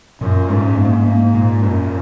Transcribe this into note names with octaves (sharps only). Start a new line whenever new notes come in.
F#2 A#2
G#2 C#4
A#3
G#2 A#3
A#2
F#2 C#4